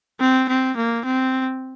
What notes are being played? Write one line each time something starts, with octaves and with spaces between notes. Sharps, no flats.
C4
C4
A#3
C4